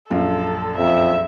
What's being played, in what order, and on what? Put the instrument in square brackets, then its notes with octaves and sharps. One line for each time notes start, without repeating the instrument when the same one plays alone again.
[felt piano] A#1 F#2 F4 [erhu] A4
[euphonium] F2 [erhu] E5